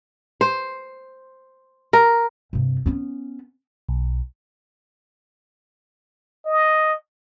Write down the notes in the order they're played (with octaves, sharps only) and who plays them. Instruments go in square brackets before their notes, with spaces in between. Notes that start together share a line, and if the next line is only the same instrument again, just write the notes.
[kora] C5
A#4
[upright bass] G2 C3
B3 C#4
[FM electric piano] B1
[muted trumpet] D#5